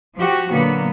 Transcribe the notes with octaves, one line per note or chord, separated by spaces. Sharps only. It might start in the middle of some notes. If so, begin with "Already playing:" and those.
F3 F#4 G4
A#2 D3 F#3 A#3 B3